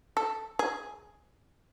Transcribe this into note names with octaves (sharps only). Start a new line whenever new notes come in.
A4
G#4